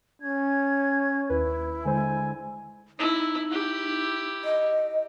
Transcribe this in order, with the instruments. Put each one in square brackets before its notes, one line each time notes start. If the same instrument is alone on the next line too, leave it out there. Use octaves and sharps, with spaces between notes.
[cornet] C#4 [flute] G#6
[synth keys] D#2 B4 [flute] E4
[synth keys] D3 G#3 C5 [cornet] G#5
[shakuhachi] D#4 [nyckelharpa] E4
[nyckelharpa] E4 G4
[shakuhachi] D#5